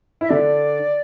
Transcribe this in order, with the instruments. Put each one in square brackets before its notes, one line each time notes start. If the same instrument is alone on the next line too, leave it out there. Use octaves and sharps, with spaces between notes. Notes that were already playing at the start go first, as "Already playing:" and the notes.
[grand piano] E4 [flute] E5
[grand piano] D3 D4 [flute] D5